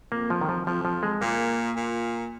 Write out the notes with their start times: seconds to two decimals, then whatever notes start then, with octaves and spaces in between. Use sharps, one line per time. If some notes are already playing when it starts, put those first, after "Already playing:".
0.12 F2 A#3
0.30 F3
0.41 D#3
0.49 F3
0.66 F2 F3
0.85 F3
1.03 G#3
1.21 A#2 A#3
1.76 A#2